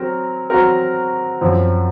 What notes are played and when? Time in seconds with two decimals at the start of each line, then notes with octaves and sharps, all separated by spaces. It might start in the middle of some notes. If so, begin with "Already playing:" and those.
Already playing: F#3 C4 A#4
0.50 F#3 C4 F#4 A#4
1.41 F#2 F3 C4